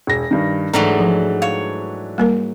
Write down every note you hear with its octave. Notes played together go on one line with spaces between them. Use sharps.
E1 A#6
G2 D#3
G#2 E3 F#3 A3 D4 A#5
F3
C#5 F5
G3 A#3 A#4